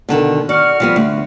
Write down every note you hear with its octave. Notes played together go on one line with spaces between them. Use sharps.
B2 D3 D#3
F#4 D5 C#6 F6
F3 G3 B3
D2